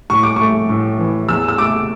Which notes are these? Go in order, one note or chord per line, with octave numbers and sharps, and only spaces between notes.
A2 C#6
D6
A3 C#6
A2
E3
E2 E6
E6
A3 D6